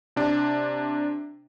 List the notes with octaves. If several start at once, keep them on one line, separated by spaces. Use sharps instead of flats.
C3 D4